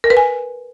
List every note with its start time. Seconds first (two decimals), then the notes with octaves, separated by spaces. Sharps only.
0.04 A#4
0.10 B4
0.17 G#5